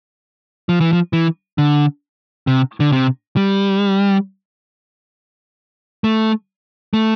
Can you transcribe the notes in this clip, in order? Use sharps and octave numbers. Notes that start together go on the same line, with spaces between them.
F3
E3
F3
E3
D3
C3
D3
C3
G3
A3
A3